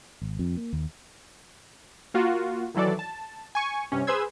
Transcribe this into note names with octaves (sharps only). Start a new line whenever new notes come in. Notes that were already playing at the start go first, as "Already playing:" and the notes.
G#1
F2
A#3
D#2
A#3 F4 F#4
D#3 E3 F#3 A4 D5
A5
G#5 C#6
G2 C3 C#4
G#4 B4 C5 C6 E6 G#6